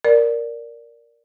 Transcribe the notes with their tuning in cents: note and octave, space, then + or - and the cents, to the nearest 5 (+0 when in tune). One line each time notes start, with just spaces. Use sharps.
A#4 +0 D5 +0